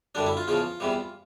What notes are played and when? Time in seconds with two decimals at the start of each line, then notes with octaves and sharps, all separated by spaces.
0.15 F#2 D3 G3 D4
0.26 E4
0.37 F4
0.48 E2 C#3 F3 F4
0.80 E2 C3 E3 G3